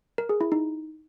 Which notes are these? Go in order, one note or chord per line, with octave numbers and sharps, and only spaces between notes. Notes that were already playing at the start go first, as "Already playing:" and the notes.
A#4
G#4
E4
D#4